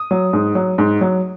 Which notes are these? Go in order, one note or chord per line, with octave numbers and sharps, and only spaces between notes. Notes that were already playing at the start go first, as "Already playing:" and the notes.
Already playing: D#6
F#3
G#2
F#3
G#2
F#3